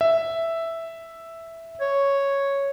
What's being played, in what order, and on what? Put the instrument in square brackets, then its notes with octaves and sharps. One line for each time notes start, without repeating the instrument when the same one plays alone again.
[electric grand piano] E5
[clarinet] C#5